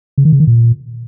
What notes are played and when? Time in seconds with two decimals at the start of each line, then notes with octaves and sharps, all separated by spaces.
0.18 C#3
0.25 D#3
0.32 C#3
0.40 D#3
0.47 A#2